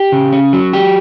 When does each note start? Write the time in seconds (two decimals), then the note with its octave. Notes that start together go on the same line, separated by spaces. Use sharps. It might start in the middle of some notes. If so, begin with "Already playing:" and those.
Already playing: G4
0.12 C#3
0.33 C#4
0.53 F#3
0.73 G4